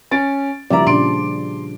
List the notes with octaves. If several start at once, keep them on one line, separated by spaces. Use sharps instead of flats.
C#4 A6 D7
F#1 F3 G3 D5 E5 A#5
A#2 C#3 D4 C6 D7